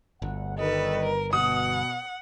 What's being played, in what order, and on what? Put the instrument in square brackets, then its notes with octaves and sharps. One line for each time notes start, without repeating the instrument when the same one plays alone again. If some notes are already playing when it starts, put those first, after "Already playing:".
[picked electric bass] G1 [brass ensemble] D2 F#5
[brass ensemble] D#3 G3 D#5 [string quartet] A4 B4
[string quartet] A#4
[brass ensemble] B2 [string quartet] F#5 [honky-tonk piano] D#6